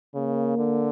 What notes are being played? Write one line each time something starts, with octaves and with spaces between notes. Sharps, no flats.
C#3 A#3
D3